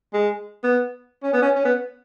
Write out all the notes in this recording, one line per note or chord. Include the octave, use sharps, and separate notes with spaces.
G#3
B3
C#4
B3
C#4
C#4
B3